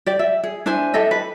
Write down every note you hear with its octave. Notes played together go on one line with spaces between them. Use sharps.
G4 D5
E5
G#4
D4 E4 C5 G#5
G4 A4 D#5 E5
B4